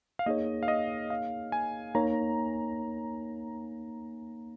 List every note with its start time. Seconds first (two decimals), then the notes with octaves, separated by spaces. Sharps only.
0.19 F5
0.26 A#3 D#4 G#4 C#5 D#5
0.63 F5
0.68 D#5
1.10 F5
1.52 G#5
1.95 A#3 D#4 C#5 A#5